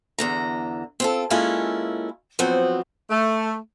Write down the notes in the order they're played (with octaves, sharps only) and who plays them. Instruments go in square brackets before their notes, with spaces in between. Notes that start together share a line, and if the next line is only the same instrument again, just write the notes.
[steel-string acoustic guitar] E2 D3 A#5
C4 F4 A4
G#3 A#3 C#4 E4 F4 A4
F3 F#3 B3 C4 F#4
[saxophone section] A3